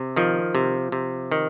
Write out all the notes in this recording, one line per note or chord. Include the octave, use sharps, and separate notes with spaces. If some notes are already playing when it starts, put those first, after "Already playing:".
Already playing: C3
D#3 F3
C3
C3
D#3